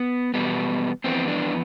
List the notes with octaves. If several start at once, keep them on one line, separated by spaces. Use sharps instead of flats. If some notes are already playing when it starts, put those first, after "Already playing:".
Already playing: B3
E2 B2 G3 B3
F2 E3 B3 C4
D4